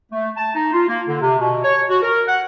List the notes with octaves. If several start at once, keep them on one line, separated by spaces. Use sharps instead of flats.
A3
A5
D#4
F4
A#3
D3
C3
B2
C#5
F#4
A#4
F#5